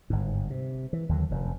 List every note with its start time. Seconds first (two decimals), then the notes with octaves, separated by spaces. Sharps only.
0.10 G1 G#2
0.50 C3
0.93 E3
1.09 D#2 D3 F#3
1.31 F1 F#2